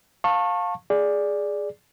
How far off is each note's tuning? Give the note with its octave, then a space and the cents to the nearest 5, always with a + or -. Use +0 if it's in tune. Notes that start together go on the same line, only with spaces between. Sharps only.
F5 +15 A5 +20 C#6 -25
G#4 +0 D5 +0